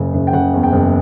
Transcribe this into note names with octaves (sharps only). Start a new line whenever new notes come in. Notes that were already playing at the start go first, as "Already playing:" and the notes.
Already playing: F#1 C#3
F#1
G5
C#3 F#5
E2
G5
F#1